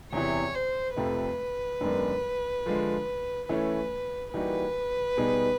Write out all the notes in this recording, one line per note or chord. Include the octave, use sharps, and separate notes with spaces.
E2 C3 E3 C#5
C5
F2 C3 F3 A3 B4
F#2 D#3 G#3 B3 D4
D3 F3 G#3
E3 A3 C#4 E4 B4
E3 G3 A#3 D#4 F#4 B4
B2 G3 B3 D#4 G#4